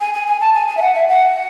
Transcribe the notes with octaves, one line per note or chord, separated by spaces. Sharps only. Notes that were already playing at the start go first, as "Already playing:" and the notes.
G#5
G#5
G#5
A5
G#5
G#5
E5
F#5
E5
F#5